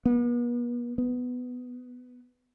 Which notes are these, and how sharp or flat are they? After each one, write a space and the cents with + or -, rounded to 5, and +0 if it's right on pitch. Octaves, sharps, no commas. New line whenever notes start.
B3 -40
B3 +10